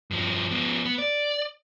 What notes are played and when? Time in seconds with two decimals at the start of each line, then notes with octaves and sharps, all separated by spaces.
0.11 G2 F3
0.51 F3 B3
0.85 B3
0.98 D5